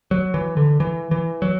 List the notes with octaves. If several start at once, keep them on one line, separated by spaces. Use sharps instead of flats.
F#3
E3
D3
E3
E3
F#3